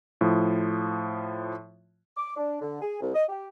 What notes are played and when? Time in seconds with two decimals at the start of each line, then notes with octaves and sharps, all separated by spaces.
0.21 A2 F3
2.17 D6
2.36 D4
2.61 D3
2.81 G#4
3.01 C2
3.14 D#5
3.29 G4